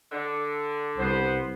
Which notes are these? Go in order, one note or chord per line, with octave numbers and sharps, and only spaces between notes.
D3
C2 B3 C5